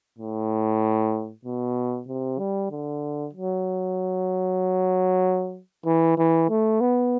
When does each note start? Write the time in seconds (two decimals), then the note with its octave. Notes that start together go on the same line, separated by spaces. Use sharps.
0.19 A2
1.45 B2
2.08 C3
2.39 G3
2.71 D3
3.33 F#3
5.86 E3
6.18 E3
6.50 A3
6.80 B3